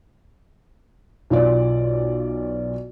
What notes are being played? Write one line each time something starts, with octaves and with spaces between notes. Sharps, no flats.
B1 F4 D5